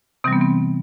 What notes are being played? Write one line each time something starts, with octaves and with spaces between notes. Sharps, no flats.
C3 E3 G3 C4
B3
C4